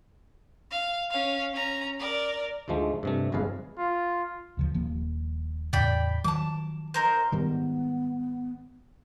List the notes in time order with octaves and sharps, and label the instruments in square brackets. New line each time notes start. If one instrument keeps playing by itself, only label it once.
[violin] F5
C#4 F5
C#4 A#5
A#4 D5
[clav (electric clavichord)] D2 G#2 F3 G#3 A3
G2 C3 A3
G1 F2 G#2 G#4 B4 F5
[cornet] F4
[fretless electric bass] D2 C#3 F3
D#1 F3 A#3
[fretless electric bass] E2 A2 C#3 [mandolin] D5 G5 B5
[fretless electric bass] D#3 F3 F#3 [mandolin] A5 D6
[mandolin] D#4 A#4 C5
[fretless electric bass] G#2 D#3 G3 [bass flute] B3